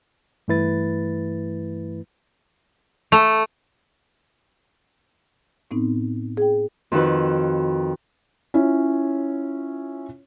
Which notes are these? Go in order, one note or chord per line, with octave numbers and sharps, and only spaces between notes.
G2 E3 A3 E4 B4 A6
A3
A2 B3 C4 D#4
G#4 G5
F2 D#3 F#4 B4
C#4 E4 F4 C#5